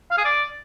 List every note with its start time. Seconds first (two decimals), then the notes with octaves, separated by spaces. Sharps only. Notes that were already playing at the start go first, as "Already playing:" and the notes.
0.11 F5
0.18 G#4
0.25 D5